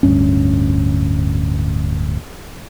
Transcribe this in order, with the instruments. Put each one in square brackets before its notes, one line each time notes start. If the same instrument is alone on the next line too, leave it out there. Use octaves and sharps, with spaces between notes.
[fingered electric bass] D1 D2 G2 C#4